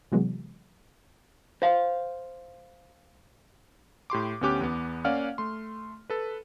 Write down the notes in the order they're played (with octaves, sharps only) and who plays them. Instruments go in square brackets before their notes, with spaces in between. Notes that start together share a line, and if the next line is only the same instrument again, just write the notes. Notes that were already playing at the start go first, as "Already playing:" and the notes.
[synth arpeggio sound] C3 E3 F#3 G#3 B3
[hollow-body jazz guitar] C5 F5
[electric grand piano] A2 G4 C6 D6
D2 B3 C#4 G4 D6 F#6
E2 B3
A#3 C#4 D5 F5 F#5 F6
A3 C6
A4 B4